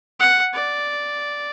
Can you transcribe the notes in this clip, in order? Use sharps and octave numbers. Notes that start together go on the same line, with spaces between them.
F#5
D5